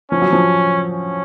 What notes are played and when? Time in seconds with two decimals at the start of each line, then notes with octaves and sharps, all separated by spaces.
0.11 F3 C#4
0.22 F#3
0.33 F3
0.92 C#4